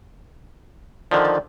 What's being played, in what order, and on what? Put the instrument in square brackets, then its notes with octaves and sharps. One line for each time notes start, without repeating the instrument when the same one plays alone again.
[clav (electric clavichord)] D3 D#3 F3 [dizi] D5